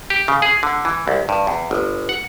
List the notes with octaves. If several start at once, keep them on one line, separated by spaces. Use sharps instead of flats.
G4
C#3
G#4
D3
E3
C2
G2
E2
G1
F#5